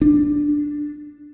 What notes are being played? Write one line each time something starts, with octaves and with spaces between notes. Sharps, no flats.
D4